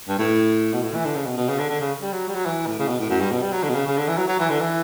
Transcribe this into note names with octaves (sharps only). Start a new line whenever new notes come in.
G2
A2
B2
A2
E3
D3
C#3
B2
B2
C#3
D3
D3
C#3
G3
F#3
G3
F#3
E3
A2
C#3
B2
A2
F#2
G2
B2
G3
F#3
D3
B2
C#3
C#3
D3
E3
F#3
F#3
E3
D3
E3